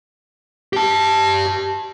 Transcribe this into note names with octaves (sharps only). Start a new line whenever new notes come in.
G4 A5